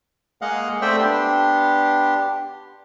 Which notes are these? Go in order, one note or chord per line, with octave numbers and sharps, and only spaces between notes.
G#3 A#3 D#5 F5 F#5
A3 C4 C5 D5 E5 G5
B3 D4 G4 C6